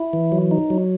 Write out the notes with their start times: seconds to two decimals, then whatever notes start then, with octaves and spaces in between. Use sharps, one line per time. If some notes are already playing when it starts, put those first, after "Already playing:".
Already playing: E4
0.13 E3
0.32 F#3
0.51 D#4
0.70 F#3